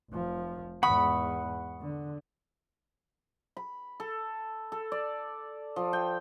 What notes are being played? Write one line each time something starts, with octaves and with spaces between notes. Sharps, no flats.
F1 F3
E2 G#2 F#5 B5 C#6 D#6
D3
B5
A4
A4
D5
F3
G5